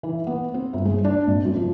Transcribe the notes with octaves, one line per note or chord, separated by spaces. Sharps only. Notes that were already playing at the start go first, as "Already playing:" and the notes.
E3
B3
C4
G1
G#3
D4
G#1
F#2
F3